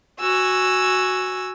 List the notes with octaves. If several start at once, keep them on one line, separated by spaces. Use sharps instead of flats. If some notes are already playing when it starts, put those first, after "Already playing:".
F#4 G#5 E6